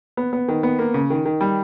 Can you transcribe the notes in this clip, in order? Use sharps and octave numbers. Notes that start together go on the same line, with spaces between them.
B3
B3
D#3
B3
A#3
C#3
D#3
D#3
G3